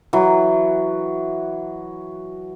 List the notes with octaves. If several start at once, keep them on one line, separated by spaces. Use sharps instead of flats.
E3 F#3